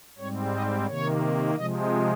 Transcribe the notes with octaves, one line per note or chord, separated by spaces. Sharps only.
G#2 G3 C4 C#5
D#5
C3 D#3 A#3 C#5
C3 F3 G#3 D#5